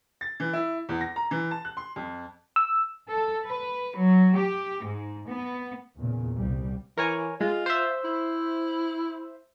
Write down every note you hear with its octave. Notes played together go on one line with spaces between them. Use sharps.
A6
E3
E4
E2
A#6
A#5
E3
A5
F#6
C6
F2
E6
A4
B4
F#3
G4
G#2
B3
E2 A#2 C#3
C2 G3
E3 A#4 C#5 G#5
G#3 F4
C5 E5
E4